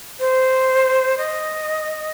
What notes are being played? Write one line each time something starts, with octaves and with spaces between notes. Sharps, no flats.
C5
D#5